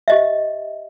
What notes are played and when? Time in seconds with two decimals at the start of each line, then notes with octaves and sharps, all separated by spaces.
0.08 G4 D#5 E5